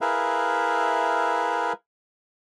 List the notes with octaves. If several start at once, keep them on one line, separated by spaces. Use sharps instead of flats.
E4 G#4 A#4 B4 E5 F5